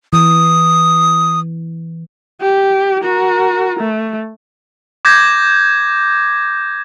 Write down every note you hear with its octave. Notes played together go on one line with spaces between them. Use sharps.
E3 D#6
G4
F#4 A#4
A3
D6 G6 G#6 A#6